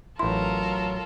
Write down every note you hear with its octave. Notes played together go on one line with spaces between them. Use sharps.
A1 F#3 E4 F4 A4 A#4 C6